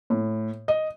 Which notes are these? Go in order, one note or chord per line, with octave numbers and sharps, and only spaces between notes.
A2
D#5